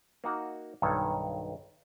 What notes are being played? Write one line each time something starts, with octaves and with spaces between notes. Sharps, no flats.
A#3 D#4 F#4
B1 G2 D#3 A4 C#5